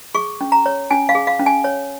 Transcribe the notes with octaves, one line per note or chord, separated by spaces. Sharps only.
G#4 C#6
C#4
A#5
C#5
C#4 G#5
F5
G#4
F5
C#4
G#5
C#5